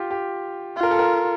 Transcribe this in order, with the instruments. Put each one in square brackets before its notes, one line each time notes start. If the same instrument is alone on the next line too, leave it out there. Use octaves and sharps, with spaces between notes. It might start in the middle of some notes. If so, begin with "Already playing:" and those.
Already playing: [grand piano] F4 G4
G4
[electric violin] F4
[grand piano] A#4
A4
A#4